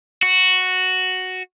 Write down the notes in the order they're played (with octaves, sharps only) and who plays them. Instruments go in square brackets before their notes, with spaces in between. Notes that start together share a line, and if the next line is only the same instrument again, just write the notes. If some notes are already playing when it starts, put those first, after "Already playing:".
[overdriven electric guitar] F#4